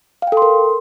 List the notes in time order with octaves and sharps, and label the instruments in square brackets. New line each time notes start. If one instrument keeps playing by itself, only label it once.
[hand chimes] F5
G5
A4
C6
A#4